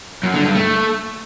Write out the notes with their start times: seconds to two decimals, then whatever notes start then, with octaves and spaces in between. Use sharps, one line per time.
0.23 F#2
0.34 D3
0.44 G2
0.55 A3